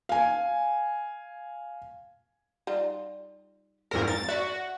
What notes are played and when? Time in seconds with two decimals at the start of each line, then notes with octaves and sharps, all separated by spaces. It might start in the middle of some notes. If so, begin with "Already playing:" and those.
0.09 F5 G#5
2.67 G3 D#4 F4
3.91 F2 G#2 A4 A#4
4.08 A#4 A6
4.29 F#4 D5 E5